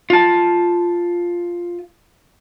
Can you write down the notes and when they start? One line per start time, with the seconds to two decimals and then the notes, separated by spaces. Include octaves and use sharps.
0.10 F4 A5